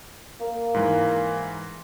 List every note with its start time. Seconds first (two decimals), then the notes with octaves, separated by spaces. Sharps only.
0.40 A#3
0.74 G#2 E3